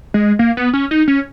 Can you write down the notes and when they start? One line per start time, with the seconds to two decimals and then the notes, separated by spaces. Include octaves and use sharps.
0.14 G#3
0.39 A#3
0.57 B3
0.74 C#4
0.91 D#4
1.08 C#4